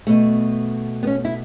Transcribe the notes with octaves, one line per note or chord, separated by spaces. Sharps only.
B2 A3
B3
C#4
E4